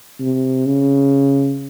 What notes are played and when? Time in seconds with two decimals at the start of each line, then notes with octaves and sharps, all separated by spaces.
0.20 C3
0.66 C#3